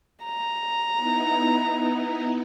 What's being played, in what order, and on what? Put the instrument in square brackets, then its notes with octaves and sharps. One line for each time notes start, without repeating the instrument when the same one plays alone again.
[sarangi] A#5
[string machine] B3 D#4 E4